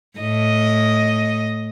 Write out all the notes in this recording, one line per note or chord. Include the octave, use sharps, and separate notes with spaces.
A2 D#5